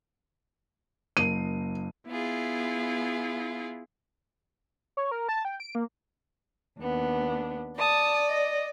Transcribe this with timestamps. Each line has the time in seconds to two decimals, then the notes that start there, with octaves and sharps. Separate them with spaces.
1.17 F#1 A#3 C7 D#7
2.07 B3 E4 F4 G#4
4.97 C#5
5.11 A#4
5.29 A5
5.45 G5
5.60 D7
5.75 A#3
6.81 D#2 B3 D4
7.78 D5 A5 D#6
8.29 D#5